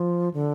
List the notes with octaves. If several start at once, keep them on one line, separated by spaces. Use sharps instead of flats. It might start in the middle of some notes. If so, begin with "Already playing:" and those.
Already playing: F3
D3